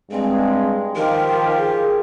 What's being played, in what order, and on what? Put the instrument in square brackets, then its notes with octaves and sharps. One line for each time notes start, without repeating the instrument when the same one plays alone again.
[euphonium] G2 [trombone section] G#3 [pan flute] C4
[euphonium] D#3 [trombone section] F3 F4 G4 [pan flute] A#4
[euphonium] G#4